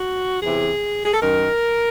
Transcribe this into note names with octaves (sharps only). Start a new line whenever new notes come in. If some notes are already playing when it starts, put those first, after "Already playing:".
Already playing: F#4
E2 C3 E3 G#4
G#4
A4
F#2 D#3 A#4